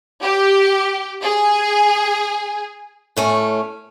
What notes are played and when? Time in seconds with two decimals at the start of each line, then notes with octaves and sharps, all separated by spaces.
0.22 G4
1.23 G#4
3.17 A2 A3 C#4